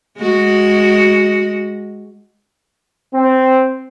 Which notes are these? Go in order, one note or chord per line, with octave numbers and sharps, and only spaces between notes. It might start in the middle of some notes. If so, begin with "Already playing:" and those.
G#3 F#4
C4